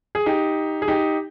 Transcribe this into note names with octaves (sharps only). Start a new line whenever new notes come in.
G#4
D#4 G4
G#4
D#4 G4